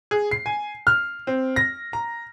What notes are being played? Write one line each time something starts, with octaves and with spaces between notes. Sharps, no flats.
G#4
C7
G#5
F6
C4
A#6
A#5